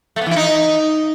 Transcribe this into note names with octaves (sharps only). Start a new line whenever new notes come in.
A3
B3
E3
E4
D#4